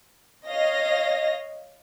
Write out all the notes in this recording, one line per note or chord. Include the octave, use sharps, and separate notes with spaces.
C#5 D#5 F5 A#6